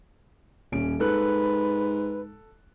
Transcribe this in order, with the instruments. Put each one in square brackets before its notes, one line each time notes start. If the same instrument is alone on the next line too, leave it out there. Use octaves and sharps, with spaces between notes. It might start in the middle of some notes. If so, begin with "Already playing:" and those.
[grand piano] D#1 C#4 D7
[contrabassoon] G#2 [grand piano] A4 F#6 [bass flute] B4